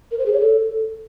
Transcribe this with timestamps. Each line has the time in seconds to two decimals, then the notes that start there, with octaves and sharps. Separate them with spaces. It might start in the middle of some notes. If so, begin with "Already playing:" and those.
0.11 A#4
0.19 C5
0.26 G#4
0.33 C#5
0.40 A4